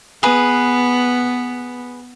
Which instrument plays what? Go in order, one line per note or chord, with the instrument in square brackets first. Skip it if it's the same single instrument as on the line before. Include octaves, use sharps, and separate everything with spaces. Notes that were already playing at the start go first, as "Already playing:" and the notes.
[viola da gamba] B3 [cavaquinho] G#4 B4